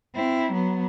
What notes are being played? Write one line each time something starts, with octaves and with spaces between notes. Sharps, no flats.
C4 E4
F#3 B3